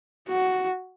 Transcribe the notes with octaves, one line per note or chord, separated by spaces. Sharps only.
F#4